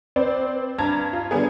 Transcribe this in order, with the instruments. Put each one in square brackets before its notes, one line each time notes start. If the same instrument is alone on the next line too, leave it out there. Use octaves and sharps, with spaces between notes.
[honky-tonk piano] C4 B4 C5 D5
G2 A5 A#5 G#6
F4
D3 G3 B3 G#4